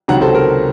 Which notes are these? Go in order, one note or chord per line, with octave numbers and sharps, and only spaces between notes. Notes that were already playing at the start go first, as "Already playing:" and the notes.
C#2 C3 D#3 F#3 F#5 A#5
A4 C5
A#4